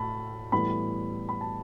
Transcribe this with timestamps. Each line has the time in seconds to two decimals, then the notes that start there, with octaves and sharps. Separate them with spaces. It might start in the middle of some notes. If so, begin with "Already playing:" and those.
Already playing: A2 A3 A5 B5
0.52 A2 E3 G3 B3 B5
1.29 B5
1.41 A5